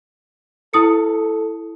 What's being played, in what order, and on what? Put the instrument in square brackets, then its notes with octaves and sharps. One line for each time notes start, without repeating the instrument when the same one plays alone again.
[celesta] E4 D#6 C#7 [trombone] A4